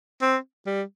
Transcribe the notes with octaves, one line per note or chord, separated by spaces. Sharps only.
C4
G3